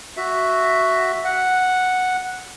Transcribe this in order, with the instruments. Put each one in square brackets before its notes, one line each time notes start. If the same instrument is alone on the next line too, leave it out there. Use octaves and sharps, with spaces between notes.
[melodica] F#4 E5
F#5